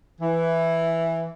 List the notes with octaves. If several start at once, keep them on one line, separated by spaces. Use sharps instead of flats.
E3